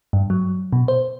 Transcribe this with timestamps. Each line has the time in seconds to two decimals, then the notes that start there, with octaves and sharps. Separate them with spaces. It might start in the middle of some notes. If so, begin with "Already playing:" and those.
0.13 G2
0.30 F#3
0.73 B2
0.88 C5